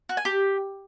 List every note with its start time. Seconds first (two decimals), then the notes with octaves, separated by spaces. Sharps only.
0.09 F#4
0.17 G#5
0.25 G4